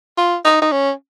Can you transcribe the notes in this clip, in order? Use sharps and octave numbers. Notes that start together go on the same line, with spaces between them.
F4
D#4
D#4
C#4